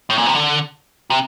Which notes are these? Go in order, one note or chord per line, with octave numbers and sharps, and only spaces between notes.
A2
A#2
C3
D3
C3